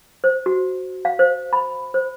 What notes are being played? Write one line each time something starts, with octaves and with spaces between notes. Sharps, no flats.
C5
F#4
F5
C5
B5
C5